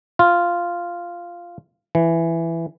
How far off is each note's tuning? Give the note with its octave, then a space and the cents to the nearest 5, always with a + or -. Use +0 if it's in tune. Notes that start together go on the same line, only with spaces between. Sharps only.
F4 -5
E3 +10